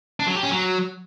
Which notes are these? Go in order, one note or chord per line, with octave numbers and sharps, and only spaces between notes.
D4
F#3
G4
C#4
F#3